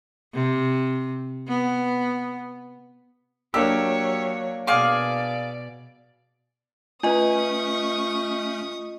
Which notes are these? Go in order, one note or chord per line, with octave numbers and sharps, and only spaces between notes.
C3
B3
F#3 A#3 D4 G4 C#5 E6
B2 G#4 D5 F5 D6
A3 C#4 F4 B4 D#5 G#5 C#6 D#6